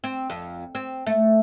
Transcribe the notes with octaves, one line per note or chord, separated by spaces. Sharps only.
C4
F2
C4
A3